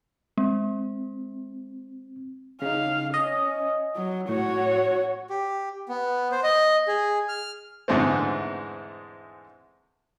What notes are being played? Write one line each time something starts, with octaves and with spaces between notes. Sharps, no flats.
G#3 C4
C#3 D#4 F5
C#4 D#5
F#3
A2 F#4 C#5
G4
B3
C5
D#5
G#4
F6
E2 G#2 D3 G#3 A3 C4